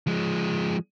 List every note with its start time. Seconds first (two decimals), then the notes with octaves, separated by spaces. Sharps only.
0.07 F3 G#3